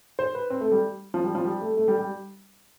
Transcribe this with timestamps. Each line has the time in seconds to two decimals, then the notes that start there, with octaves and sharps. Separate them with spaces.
0.19 C5
0.35 B4
0.50 C4
0.61 A3
0.72 G3
1.14 F3
1.24 G3
1.35 F3
1.45 G3
1.61 A3
1.77 A3
1.88 G3
1.98 G3